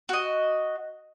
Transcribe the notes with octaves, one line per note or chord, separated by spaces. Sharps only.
F#4 D#5